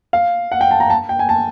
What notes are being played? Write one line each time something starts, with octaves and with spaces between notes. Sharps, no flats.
F5
F#5
G5
A5
A#5
A5
G5
G#5
A5